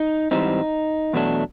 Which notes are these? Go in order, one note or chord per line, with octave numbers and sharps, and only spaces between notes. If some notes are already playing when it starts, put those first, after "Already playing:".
Already playing: D#4
G#2 E3 G3 C4 D#4
E2 B2 F#3 A3 D4